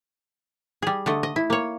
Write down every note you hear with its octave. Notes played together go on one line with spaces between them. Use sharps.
G3 G#4
D3 A3 D#5
D#5
E4
A#3 C#5